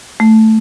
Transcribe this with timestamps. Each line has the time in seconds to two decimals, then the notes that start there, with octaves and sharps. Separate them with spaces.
0.20 A3